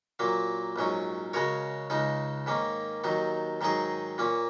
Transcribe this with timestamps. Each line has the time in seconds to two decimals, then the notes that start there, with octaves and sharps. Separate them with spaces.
0.19 A#2 F#3 A#3
0.76 A#1 G#2 F#3 C#4
1.34 C#3 G#3 F#4 A#4 C#5
1.90 C#2 C#3 G#3 D#4
2.46 G#2 D#3 A#3 C#4
3.04 D#2 D#3 F#3 D#4
3.61 G#2 D#3 F#3 D#4 G#4
4.18 A#2 A#3 C#4